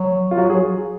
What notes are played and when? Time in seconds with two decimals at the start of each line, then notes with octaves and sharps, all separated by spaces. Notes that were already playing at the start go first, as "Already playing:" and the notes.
Already playing: F#3
0.31 F4
0.38 F#3 F#4
0.50 F#3 G#4